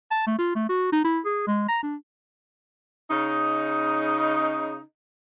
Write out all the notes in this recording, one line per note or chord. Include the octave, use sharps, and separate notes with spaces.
A5
A3
F4
A3
F#4
D#4
E4
G#4
G#3
A#5
D4
C#3 D#4